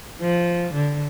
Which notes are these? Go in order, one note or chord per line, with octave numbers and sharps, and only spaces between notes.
F3
D3